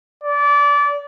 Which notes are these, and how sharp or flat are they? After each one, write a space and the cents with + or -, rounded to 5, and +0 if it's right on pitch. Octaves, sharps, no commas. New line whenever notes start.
D5 -25